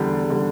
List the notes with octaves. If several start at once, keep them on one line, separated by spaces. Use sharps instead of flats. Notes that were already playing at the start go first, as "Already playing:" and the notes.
Already playing: E2 D3 G3
D3 G3